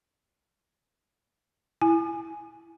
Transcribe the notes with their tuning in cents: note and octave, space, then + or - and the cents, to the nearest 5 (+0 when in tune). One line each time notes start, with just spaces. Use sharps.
E4 +0 G#5 +0